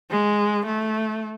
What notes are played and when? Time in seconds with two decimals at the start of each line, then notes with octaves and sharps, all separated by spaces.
0.10 G#3
0.66 A3